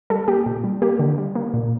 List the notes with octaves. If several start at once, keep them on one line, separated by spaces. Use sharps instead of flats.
G3 A4
A#3 G4
A#2
G3
A#3 G4
D3
G3
A#3
A#2